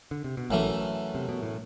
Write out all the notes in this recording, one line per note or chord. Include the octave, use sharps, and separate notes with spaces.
D3
C3
B2
A1 F#2 A2 E3 A3
C3
B2
A2